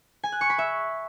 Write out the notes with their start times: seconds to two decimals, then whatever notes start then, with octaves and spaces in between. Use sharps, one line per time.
0.24 G#5
0.32 F#6
0.41 C#6
0.50 B5
0.58 E5